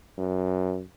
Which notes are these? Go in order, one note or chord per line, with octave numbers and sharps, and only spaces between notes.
F#2